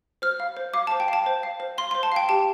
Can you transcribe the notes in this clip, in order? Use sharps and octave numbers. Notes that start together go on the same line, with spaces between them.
C5 F6
F5
C5
F5 D6
A5
C5
G5
F5 A5
C5
F5
C5
F5 C6
C6
C5
A5
F5 G5
G4 A5